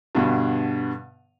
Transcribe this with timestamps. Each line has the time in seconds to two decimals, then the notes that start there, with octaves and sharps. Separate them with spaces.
0.15 G2 B2 D3